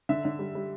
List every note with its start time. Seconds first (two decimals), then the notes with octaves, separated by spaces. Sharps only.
0.09 D3 E5
0.25 D3
0.39 G3
0.55 G3